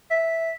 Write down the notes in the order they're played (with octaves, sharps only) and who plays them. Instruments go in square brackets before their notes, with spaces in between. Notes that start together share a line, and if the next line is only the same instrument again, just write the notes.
[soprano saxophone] E5